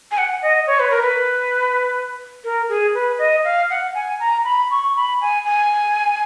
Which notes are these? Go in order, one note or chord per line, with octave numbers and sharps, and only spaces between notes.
G#5
F#5
D#5
C#5
B4
A#4
B4
A#4
G#4
B4
D#5
F5
F#5
G#5
A#5
B5
C#6
B5
G#5
G#5